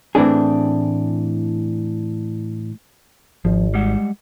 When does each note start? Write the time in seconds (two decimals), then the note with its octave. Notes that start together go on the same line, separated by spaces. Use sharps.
0.15 A2 E3 C4 D4 G#4
3.45 G#1 F3
3.74 G3 G#3 F#5